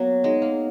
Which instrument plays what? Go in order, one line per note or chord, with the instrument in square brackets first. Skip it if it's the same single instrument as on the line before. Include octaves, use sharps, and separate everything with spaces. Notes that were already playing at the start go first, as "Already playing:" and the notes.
Already playing: [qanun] F#3 A#3 [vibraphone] B3
[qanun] G#3 [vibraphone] D#4 G#4 C#5 F#5
[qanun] A#3